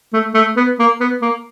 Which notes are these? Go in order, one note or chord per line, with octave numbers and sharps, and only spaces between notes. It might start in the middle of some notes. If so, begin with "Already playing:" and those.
A3
A3
B3
A#3
B3
A#3